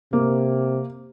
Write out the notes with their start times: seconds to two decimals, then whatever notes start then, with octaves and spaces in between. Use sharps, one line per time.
0.13 C3 A#3